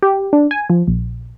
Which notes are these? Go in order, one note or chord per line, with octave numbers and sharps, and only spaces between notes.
G4
D4
G#5
F3
A#1